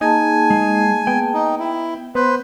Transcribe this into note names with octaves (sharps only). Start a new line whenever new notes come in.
A#3 D#4 G#4 G#5 A5
G#3
B3 G5
D#4
E4
B3 B4 C5